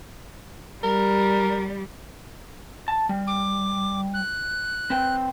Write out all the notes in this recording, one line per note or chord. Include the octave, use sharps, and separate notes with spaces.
G3 A#4
A5
G3
D6
F#6
C4 B4 G5